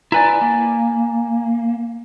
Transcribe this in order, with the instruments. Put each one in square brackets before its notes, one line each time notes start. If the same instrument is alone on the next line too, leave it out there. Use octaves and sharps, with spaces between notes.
[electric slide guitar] E4 B4 D5 [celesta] G#5 A#5
[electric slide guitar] A#3